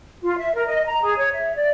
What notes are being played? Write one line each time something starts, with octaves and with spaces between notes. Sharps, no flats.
F4
E5
A#4
D#5
A#5
G#4
C#5
E5
D5